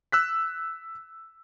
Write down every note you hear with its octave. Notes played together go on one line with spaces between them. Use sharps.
E6 F#6 B6